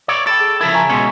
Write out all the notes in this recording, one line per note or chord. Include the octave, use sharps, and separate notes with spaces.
C#5 D5
A4 G5 B5 D7
G#4
C#3 F3 E4 A#4
G#5 A#5 C#6
B2 G#3 C#4 C6 B6 C#7